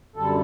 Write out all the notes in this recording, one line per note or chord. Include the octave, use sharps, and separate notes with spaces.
F#2 D3 G3 A4